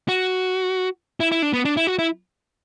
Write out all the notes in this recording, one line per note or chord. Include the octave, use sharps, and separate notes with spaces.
F#4
E4
E4
D4
B3
D4
E4
F#4
E4